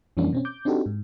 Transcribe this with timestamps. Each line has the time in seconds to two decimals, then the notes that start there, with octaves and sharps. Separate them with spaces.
0.17 F2 E3 G3 A#3 C#4 D4
0.33 B2 C4 C#4
0.45 D6 G6
0.65 C4 D4 D#4 F#4 G4 A4
0.86 G#2